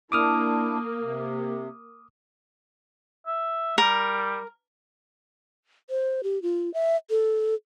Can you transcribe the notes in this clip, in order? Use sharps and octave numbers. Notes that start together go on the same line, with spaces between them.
A#3 D4 E4 D6 D#6 F6
C3
E5
G3 A#4
C5
G4
F4
E5
A4